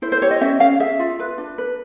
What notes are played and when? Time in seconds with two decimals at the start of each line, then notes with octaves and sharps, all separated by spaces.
0.02 E4 C5
0.12 C5
0.21 G4 C#5
0.31 D#5
0.41 C#4 E5
0.60 C#4 F5
0.80 G#4 E5
0.99 F4
1.19 B4
1.38 D4
1.58 B4